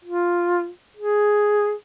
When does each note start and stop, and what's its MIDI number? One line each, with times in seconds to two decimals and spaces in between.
0.05 0.69 65
0.97 1.73 68